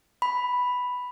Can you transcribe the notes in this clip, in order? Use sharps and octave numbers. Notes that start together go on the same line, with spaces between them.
B5